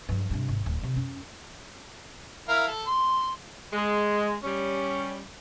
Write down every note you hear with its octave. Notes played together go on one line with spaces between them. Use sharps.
G2 F#3
G2 C3
G#1
D1
C3 D#3
F#2 C#4
E4 A#4 F5
A4
C6
G#3
G3 C#4